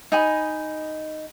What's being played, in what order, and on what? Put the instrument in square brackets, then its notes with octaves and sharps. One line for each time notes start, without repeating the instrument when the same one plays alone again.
[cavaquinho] D#4 G#5 B5